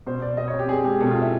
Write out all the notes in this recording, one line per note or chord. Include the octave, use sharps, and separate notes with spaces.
B2 C5
B2 D5
B2 D#5
C#5
C4
G4
C4 G#4
G#3 G4
B2 A4
F4
C4
E4